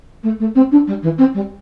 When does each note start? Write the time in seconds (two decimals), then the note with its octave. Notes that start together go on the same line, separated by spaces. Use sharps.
0.23 A3
0.40 A3
0.55 C4
0.72 D4
0.87 G3
1.03 E3
1.18 C4
1.34 G3